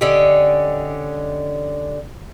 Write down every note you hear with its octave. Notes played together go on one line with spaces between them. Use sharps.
D3 C#4 D#4 G4